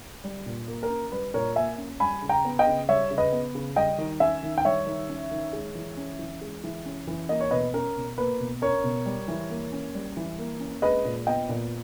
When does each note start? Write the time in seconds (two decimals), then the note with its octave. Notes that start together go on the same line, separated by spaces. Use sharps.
0.24 G3
0.46 A#2
0.68 A#3
0.83 A#4
0.90 C#4
1.12 G3 B4
1.34 A#2 A#4 C#5
1.56 A#3 E5 G#5
1.78 C#4
2.00 G3 G#5 B5
2.22 C#3
2.29 G5 A#5
2.45 B3
2.59 D#5 G5
2.67 C#3
2.89 G3 C#5 E5
3.11 C#3
3.18 B4 D#5
3.32 B3
3.55 C#3
3.76 G3 D#5 G5
3.98 D#3
4.20 C#4 E5 G#5
4.43 D#3
4.58 G5
4.65 G3 C#5 E5
4.87 D#3
5.09 C#4
5.31 D#3
5.53 G#3
5.75 E3
5.97 C#4
6.19 E3
6.41 G#3
6.64 E3
6.86 C#4
7.07 E3
7.29 A#3 D#5
7.40 C#5
7.51 B2 B4 D#5
7.73 C#4 A#4
7.96 B2
8.18 A#3 B4
8.40 B2
8.62 C#4 A#4 C#5
8.84 B2
9.06 G3
9.28 E3
9.50 A#3
9.72 C#4
9.95 G3
10.17 E3
10.38 A#3
10.60 C#4
10.82 G#3 B4 D#5
11.05 A#2
11.26 B3 D#5 G5
11.49 A#2